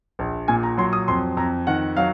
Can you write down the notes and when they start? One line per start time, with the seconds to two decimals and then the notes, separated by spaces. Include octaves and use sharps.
0.19 A#1
0.48 A#2 G#5
0.63 A#5
0.78 F#3 C6
0.93 D#6
1.08 F2 C6
1.37 F2 A#5
1.67 D#3 F#5
1.97 F#3 F5